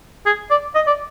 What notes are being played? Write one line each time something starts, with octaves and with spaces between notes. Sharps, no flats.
G#4
D5
D#5
D5